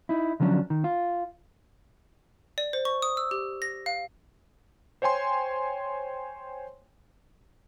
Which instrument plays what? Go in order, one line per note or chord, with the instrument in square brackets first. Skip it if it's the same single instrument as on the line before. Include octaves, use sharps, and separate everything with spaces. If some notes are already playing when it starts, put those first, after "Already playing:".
[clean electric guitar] D#4 E4
D3 F3 F#3 C#4 D4
D#3
F4
[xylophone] D5
C5
C#6
D#6
E6
G4
A#6
F5
[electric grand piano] C5 C#5 G5 G#5 C6